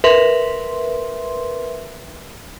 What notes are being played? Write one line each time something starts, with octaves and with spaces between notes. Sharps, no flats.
A#4 B4 E5 C6